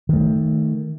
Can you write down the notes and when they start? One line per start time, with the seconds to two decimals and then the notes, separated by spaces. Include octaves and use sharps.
0.09 D#3 A3